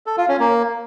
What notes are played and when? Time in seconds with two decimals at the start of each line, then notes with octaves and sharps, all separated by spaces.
0.06 A4
0.17 F4
0.28 C#4
0.40 A#3